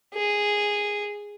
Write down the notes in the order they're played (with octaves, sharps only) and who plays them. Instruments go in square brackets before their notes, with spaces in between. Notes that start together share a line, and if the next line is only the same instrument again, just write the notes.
[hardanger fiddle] G#4